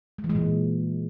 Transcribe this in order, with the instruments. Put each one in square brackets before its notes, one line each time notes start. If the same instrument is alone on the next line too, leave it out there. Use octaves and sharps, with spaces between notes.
[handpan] G#3
E3
G#3
A#2